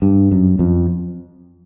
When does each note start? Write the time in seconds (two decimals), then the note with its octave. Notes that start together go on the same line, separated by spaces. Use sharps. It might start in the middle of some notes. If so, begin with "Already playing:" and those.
0.02 G2
0.31 F#2
0.59 F2